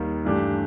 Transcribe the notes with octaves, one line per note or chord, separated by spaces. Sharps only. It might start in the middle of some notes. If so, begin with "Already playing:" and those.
Already playing: D#2 D#3 G3
G2 E3 A3 D4 G4